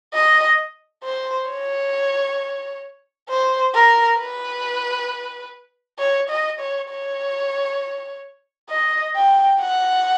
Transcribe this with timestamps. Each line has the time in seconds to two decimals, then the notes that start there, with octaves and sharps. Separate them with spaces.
0.13 D#5
1.04 C5
1.49 C#5
3.29 C5
3.74 A#4
4.18 B4
5.99 C#5
6.29 D#5
6.60 C#5
6.90 C#5
8.70 D#5
9.16 G5
9.60 F#5